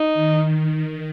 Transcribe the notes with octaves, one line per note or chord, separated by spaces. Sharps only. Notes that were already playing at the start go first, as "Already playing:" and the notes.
Already playing: D#4
D#3